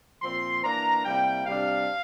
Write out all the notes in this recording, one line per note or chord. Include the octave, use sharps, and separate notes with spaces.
A#2 F3 C4 C6
E3 A#3 D4 A#5
C3 G3 A#3 E4 G5
C3 G3 D4 F5